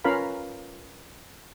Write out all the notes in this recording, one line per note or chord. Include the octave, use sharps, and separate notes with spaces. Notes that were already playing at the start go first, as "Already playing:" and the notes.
C#4 F4 A#4 B4 F5 B5